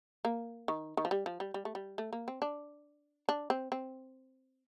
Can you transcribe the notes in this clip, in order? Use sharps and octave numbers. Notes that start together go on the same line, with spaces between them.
A#3
D#3
D#3
F3
G3
F3
G3
G3
A3
G3
A3
A#3
C4
D4
D4
C4
C4